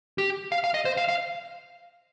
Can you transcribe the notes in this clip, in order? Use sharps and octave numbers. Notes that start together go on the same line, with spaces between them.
G4
F5
F5
D#5
C5
F5
F5